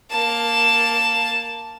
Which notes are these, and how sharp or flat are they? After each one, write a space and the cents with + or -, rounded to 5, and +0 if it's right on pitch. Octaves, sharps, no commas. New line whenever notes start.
A#3 +0 A5 +5